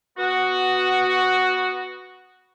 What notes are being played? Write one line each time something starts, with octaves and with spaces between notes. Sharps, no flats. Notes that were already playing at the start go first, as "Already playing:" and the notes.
B3 F#4